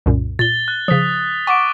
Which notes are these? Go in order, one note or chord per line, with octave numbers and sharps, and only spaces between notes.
C2 F#2 A#2
A#2 A6 G7
F#6
C#3 F3 D#6 B6
F#5 C#6 D6 D7